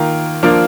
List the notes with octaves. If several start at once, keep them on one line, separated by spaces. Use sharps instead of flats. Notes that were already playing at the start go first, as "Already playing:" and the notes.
Already playing: D#3 A#3 F4
F3 A#3 D4 F4 A#4